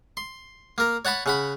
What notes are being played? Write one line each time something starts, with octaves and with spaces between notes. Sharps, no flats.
C6
A#3 A#4
C#5 F#5 A5 B5 C#6
C#3 F#5 B5